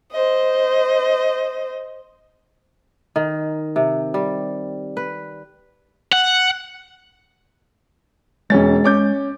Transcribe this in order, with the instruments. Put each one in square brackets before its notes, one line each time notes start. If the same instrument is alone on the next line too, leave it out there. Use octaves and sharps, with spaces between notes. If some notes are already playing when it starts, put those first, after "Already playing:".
[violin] C5 D#5
[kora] D#3
C3
G3
B4
[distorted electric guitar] F#5
[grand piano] E1 C#4 A6 [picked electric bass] G#3
[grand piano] C#4 D6 G6